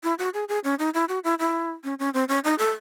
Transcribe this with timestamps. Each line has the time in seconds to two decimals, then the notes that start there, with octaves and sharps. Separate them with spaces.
0.04 E4
0.19 F#4
0.34 G#4
0.49 G#4
0.64 C#4
0.79 D#4
0.94 E4
1.09 F#4
1.24 E4
1.39 E4
1.84 C#4
1.99 C#4
2.14 C4
2.29 C#4
2.44 D#4
2.59 A4